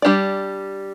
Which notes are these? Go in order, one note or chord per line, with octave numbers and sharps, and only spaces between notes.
G3 D4 G4 D5